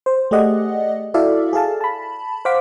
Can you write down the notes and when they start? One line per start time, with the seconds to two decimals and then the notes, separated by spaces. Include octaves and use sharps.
0.06 C5
0.31 A3 G4 G#4 D5 D#5 F#5
1.14 E4 F#4 A4 D5 E5 F5
1.53 G#4 A4 F5 A5
1.81 A5 B5
2.45 C5 F5 F#5 D6 B6